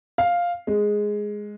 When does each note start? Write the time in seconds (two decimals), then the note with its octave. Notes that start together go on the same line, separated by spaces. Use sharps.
0.18 F5
0.67 G#3